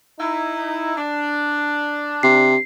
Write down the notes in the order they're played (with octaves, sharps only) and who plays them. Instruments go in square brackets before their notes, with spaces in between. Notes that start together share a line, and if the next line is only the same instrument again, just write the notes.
[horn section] D#4 E4
D4
[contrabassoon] C3 [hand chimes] C7